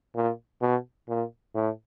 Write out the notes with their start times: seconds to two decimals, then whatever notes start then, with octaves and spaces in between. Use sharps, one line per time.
0.15 A#2
0.62 B2
1.08 A#2
1.55 A2